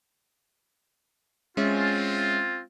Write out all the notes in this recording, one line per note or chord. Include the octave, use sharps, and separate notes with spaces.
G#3 C4 C#4 F4 E5